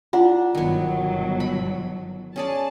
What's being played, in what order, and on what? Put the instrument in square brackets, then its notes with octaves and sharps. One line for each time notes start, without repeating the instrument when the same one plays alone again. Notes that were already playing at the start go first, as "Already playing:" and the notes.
[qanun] D4 [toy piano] E4 F4 F#5
[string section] G1 B2 F#3 [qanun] D#3 B3
[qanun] B5
[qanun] C#4 G#4 D5 [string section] A5